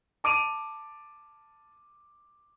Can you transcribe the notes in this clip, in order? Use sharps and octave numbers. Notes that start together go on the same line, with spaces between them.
A5 D6 D7 D#7 F7